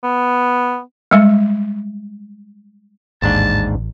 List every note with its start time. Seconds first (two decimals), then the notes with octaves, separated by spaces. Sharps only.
0.03 B3
1.11 G3 G#3
3.22 A1 D#2 G#2 D4 A5